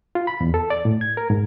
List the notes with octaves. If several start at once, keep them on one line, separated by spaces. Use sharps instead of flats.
F4
B5
E2
A4
D5
A2
G#6
A#4
G#2